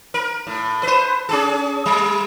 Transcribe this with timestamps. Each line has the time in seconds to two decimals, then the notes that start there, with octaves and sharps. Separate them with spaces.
0.14 A#4
0.47 A2
0.83 B4 C5
1.29 C#4 G#4 A4
1.86 G3